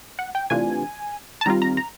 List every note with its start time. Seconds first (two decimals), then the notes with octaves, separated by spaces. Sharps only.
0.19 F#5
0.35 G5
0.50 C3 E3 A3 D4 F4 G#5
1.41 A5
1.46 D#3 G3 C4 F4 A#5
1.62 A#5
1.77 A#5